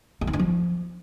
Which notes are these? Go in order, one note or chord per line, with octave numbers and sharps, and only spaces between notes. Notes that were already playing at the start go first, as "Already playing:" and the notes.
A3
D#4
D4
F3